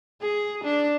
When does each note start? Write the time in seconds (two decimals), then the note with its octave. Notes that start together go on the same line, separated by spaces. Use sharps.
0.22 G#4
0.64 D4